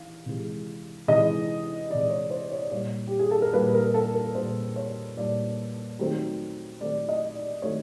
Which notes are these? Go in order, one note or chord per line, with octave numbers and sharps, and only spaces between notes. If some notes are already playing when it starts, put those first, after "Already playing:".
Already playing: E3 F5
C3 E3 G#3
C3 E3 G#3 D#5
C3 E3 G#3 D5
C#5
C5
C#5
D5
A#2 G3 A#3 C#5
G4
G#4
A4
A#4
A#2 G3 A#3 B4
A#4
A4
A#4
A#2 G3 A#3 C5
C#5
A#2 G3 A#3 D5
D#3 F#3 A3 C4
D#3 F#3 A3 C4 D5
D#5
D5
D#3 F#3 A3 C4 C#5